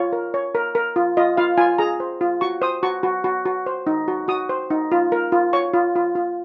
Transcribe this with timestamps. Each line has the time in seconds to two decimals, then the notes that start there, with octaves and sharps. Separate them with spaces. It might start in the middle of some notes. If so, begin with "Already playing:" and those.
Already playing: F4 C#5
0.12 A#4
0.34 C#5
0.55 A#4
0.75 A#4
0.96 F4
1.17 F4 D#5
1.37 F4 F5
1.58 F4 G#5
1.78 G#4 A#5
2.00 C5
2.21 F4
2.41 F#4 C#6
2.62 C5 D#6
2.83 F#4 C#6
3.03 F#4
3.24 F#4
3.46 F#4
3.66 C5
3.87 D#4
4.08 F#4
4.28 F#4 D#6
4.49 C5
4.70 D#4
4.92 F4
5.12 A#4
5.32 F4
5.53 C#5 C#6
5.74 F4
5.96 F4
6.15 F4